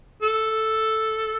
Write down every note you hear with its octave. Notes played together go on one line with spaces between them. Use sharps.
A4